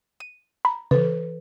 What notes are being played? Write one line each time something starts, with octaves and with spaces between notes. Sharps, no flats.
D#7
A#5 B5
C#3 E3 A4 B4